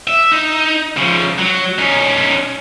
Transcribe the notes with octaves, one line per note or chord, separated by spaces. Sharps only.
E5
D#4
C#3 F3
F#3
C#4 D#4